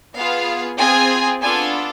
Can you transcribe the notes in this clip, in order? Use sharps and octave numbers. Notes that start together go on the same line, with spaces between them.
B3 F4 G#4 F5
C4 F4 G#4 G#5
B3 D4 F4 A4 G#5